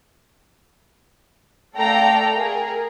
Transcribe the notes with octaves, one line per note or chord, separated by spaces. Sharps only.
A3 A4 D5 F5 G5 A#5
G#4 A#4